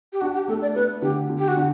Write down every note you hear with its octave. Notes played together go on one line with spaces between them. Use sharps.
G4
D4 F#4
G4
A3 A4
D5
A3 B4
D3 G4
D3
G4
F#4
D3